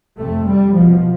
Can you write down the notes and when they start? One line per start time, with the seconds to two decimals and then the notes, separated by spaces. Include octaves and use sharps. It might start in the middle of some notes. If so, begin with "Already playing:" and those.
0.19 F2 C3 A3
0.48 G3
0.75 C2 B2 F3